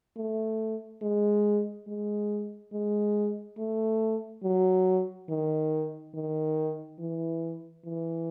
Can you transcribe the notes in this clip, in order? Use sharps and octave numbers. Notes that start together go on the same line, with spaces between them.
A3
G#3
G#3
G#3
A3
F#3
D#3
D#3
E3
E3